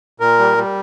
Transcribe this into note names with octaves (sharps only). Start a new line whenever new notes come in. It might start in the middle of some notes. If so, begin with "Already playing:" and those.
A#2 A#4
G3
G3